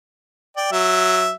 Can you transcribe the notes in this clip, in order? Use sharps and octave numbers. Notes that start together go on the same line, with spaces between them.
D5 G5
F#3 E5